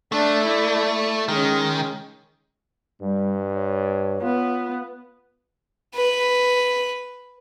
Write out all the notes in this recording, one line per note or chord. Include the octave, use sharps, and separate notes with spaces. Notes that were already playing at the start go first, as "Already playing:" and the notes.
A3 D4
E4 D5
D#3 G#3 C#4
G2 G3
C#5
B3 F4
B4